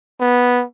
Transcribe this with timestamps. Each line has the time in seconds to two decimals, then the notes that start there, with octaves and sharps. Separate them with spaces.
0.20 B3